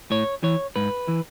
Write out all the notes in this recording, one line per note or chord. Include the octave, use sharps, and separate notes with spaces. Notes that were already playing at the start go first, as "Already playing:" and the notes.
A2 C#5
E3 C#5
G#2 B4
E3